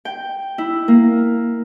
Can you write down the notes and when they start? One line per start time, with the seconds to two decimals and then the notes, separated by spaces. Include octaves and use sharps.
0.05 G5
0.58 E4
0.88 A#3